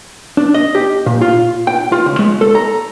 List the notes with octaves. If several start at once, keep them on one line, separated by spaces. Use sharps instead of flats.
D4
D#5
G4
A#2
F4
G5
F4
C#2
G#3
A4
A#5